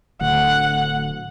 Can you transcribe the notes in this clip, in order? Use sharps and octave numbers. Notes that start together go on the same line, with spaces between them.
D1 D2 F#5